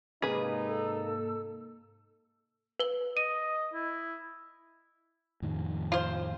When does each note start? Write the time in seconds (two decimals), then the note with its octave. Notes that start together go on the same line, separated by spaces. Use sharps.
0.22 G#2 C3 A#3 D#4 G#4 B4
0.65 A4 E6
2.80 B4 G7
3.17 D#5 D#7
3.74 E4
5.42 F2 A2 D#3
5.92 F4 C5